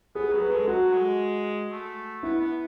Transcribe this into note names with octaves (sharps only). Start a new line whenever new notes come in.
B3 G#4
F#3 G#4
B4
G#3 A4
F#3 F#4
G#3
A3
B3 E4
B3